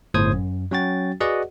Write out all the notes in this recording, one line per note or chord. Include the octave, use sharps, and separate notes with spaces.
G1 A2 C5 D#6 G#6
F#2
F#3 C#4 F#4 G5 A6
F#4 G#4 B4 D5 D#5 F#5